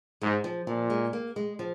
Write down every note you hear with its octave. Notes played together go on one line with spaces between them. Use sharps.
G#2 G#3
F3
A#2 F3
G#3
A#3
G#3
F3